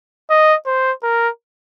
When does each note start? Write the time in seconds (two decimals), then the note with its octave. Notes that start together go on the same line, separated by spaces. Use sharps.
0.30 D#5
0.66 C5
1.03 A#4